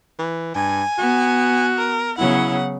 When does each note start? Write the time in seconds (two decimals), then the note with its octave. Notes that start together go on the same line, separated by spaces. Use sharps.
0.19 E3
0.55 G2 G#5
0.98 B3 F#4
1.77 A#4
2.18 C#3 F#3 B3 E4 F#5